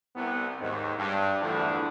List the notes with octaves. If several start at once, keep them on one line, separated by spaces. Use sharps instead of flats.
C2 B3
D#2 G#2
G2
E2 D3 E3 F3 A3 D4